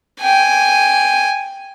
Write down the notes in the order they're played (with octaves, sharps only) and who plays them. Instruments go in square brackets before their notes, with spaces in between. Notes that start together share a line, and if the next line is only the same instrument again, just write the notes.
[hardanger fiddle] G5 G#5